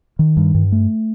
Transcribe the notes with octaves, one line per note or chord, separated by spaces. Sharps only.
D#3
G2
G2
A3